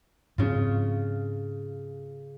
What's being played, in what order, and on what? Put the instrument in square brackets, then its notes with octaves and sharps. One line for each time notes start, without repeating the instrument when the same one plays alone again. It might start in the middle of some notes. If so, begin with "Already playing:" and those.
[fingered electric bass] G#2 F3 C4 [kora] C#3 F4